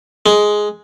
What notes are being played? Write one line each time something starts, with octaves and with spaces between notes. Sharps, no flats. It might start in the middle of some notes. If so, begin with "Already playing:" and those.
G#3